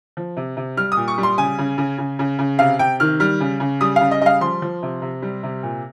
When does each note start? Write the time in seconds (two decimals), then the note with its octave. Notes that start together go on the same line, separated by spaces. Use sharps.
0.17 F3
0.37 C3
0.57 C3
0.77 G3 F6
0.92 D#6
0.97 A#2
1.08 C#6
1.18 G3
1.23 C6
1.38 C#3 G#5
1.58 C#3
1.78 C#3
1.98 C#3
2.19 C#3
2.39 C#3
2.59 C3 F5
2.79 C3 G5
3.00 D#3 F6
3.20 G3 F6
3.40 C#3
3.60 C#3
3.81 G3 D#6
3.96 C#3 F5
4.11 D#5
4.22 G3 D#5 F5
4.41 F3 C6
4.62 F3
4.83 C3
5.02 C3
5.22 G3
5.43 C3
5.63 A#2